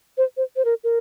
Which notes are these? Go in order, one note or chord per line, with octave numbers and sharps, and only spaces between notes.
C5
C5
C5
A#4
A#4